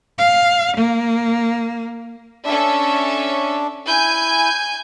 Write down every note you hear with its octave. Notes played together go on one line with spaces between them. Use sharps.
F5
A#3
C#4 D4 A4 E5
E4 G#5 G6